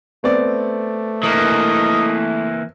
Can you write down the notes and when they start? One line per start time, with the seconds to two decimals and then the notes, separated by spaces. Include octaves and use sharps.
0.24 A3 B3 C4 D5
1.23 E3 A#3 A#4 D#5 D#6